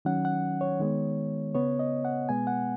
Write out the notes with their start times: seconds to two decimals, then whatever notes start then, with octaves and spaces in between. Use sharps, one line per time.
0.05 D#3 F#3 C#4 F#5
0.25 F#5
0.61 C#5
0.79 D#3 G#3 B3
1.55 C#3 B3 C#5
1.79 D#5
2.05 F#5
2.29 B2 G#3 B3 G#5
2.47 F#5